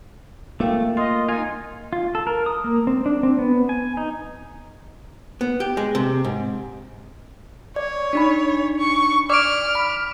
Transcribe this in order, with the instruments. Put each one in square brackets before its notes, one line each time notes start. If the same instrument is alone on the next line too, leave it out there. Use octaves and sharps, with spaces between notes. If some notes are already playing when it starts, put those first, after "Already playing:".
[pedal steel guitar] A3 [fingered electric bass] A#3 [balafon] F4 F5 G5
[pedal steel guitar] F4 [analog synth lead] D#5 [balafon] C6
[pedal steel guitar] D#4 F4 [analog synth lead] G#5
[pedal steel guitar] F4
A4
A#4
D#6
A#3
C4
D4
C4
B3
G#5
D#4
[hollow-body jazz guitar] B3
G4
G#3
C3
G#2
[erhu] C#5 [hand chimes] D5
[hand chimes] D4 D#4 B5
[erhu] C#6
[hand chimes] D5 [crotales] D6 D7 [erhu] F6
[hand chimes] B5